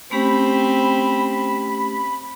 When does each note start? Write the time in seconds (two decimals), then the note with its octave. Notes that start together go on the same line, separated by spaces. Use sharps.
0.11 A3 C4 C#4 G4 B5